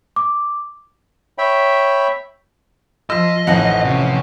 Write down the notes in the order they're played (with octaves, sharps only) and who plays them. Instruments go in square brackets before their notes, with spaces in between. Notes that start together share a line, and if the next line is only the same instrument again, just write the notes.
[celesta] D6
[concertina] C#5 E5 G5 B5
[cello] F3 F4 [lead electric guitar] D#5 [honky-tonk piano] E6 B6
[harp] A1 F#5 [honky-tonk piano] F2 [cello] D#4
[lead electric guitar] C3 [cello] C#4